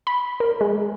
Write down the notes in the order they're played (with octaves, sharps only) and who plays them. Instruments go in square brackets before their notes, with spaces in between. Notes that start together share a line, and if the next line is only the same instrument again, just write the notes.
[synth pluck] B5
A#4
G#3